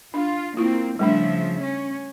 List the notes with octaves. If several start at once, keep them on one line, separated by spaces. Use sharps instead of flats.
D4 F4
A#3 C4 E4 F4
C#3 F3 G3 A3 D4 E5
C#4